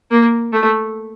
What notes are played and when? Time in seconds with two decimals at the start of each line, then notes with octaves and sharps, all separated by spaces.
0.11 A#3
0.53 A3